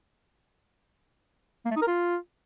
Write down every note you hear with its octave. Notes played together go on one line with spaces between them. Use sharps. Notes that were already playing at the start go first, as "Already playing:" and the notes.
A#3
A3
D#4
A#4
F4